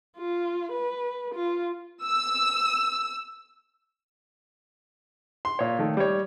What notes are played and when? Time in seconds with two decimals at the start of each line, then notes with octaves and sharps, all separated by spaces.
0.17 F4
0.72 B4
1.35 F4
2.04 E6
5.45 C6
5.59 A#2 C#5
5.79 D#3 A3
5.97 G3 C#5